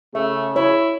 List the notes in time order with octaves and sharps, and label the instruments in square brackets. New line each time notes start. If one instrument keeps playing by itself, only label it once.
[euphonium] C#3 [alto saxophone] A3 [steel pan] E5
[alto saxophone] E4 [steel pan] C#5